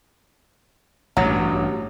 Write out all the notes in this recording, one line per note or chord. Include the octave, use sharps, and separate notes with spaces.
A1 G2 F#3